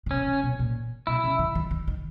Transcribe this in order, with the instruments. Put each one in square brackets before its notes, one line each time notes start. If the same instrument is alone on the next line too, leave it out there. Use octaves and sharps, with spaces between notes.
[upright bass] C#3
[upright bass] B2 [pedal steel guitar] C#4
[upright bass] D#3
B2
A#2
[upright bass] B2 [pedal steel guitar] E4
[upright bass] C#3
D#3
D#3
D#3
D#3